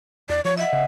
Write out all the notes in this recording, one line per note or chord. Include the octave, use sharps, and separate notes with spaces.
E2 D5
F3 C#5
D#5 E5 F#5
C#3